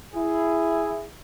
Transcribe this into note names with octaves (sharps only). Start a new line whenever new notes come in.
E4 G#4